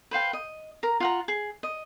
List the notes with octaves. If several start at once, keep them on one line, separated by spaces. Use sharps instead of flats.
B4 C5 F5 G5
D#5
A#4 A#5
F4 F#5 A#5
G#4
D#5